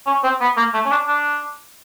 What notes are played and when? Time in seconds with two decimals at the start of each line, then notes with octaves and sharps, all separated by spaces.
0.07 C#4
0.24 C4
0.41 B3
0.57 A#3
0.74 A3
0.85 C#4
0.91 D4
1.07 D4